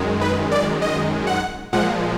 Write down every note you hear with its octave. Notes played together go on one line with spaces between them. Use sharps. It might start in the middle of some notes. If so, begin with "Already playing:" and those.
Already playing: F#2 D#3 G#3
B4
D5
D#5
F#5
A#2 F3 G#3 F#5